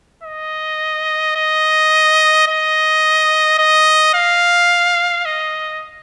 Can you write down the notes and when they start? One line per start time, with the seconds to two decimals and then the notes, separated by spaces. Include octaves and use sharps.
0.23 D#5
1.36 D#5
2.48 D#5
3.59 D#5
4.15 F5
5.26 D#5